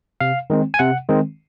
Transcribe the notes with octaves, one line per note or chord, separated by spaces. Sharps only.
C3 F5
D#3 G#3 C4
G#5
C3 F#5
D#3 G#3 C4